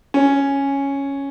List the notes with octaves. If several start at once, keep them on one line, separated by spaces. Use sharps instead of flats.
C#4